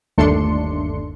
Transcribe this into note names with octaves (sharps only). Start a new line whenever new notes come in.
G1 D#2 A3 D4 C6 C#7